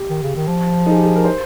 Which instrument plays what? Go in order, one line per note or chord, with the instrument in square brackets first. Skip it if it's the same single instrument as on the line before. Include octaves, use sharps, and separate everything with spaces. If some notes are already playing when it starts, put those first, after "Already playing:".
Already playing: [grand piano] G4
[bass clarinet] D#3
C#3
D#3
F3
[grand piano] D#4 G#4
G4
G#4
A#4
C5